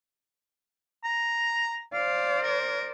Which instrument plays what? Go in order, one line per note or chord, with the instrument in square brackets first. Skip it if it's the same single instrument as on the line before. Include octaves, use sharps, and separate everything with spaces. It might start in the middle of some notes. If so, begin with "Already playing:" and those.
[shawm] A#5
[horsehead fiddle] C5 D5 [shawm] F5
[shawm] A#4